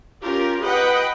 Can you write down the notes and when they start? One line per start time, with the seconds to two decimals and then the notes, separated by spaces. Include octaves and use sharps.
0.23 C#4 F4 G4 A#4
0.64 B4 D#5 F#5 G5